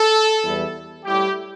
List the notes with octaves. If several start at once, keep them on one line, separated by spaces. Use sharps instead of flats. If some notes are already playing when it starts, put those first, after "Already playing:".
Already playing: A4
E2 E3 G3 E4
A2 G3 E4 G4